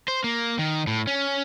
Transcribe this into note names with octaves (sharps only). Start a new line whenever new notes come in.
C5
A#3
D#3
A2
C#4